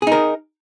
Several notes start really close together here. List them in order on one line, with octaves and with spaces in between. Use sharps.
G#4 D#4 A#4